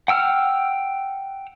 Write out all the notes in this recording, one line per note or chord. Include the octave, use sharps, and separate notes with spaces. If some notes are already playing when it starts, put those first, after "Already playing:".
F#5 G5 E6 F6